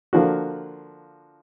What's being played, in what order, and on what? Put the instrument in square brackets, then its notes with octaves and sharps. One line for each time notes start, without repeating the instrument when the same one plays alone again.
[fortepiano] D3 F3 A#3 D4 F#4